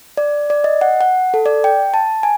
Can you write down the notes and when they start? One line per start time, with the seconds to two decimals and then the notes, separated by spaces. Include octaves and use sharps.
0.17 D5
0.50 D5
0.64 D#5
0.81 F#5
1.01 F#5
1.34 A4
1.46 D5
1.64 G5
1.94 A5
2.23 G#5